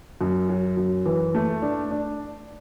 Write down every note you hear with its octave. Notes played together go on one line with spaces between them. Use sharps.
F#2
F#3
F#2
E3
A3
D4
D4